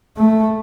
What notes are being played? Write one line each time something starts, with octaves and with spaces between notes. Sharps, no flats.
A3